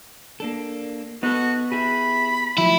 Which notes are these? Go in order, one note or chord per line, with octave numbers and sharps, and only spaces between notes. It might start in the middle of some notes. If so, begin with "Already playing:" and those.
A#3 D4 A4
B3 D#4 F#4 A4
E4 G4 G#4 B5
F3 F#3 A3 E4